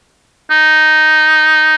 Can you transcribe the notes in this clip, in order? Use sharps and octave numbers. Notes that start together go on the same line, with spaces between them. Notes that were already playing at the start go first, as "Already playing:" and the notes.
D#4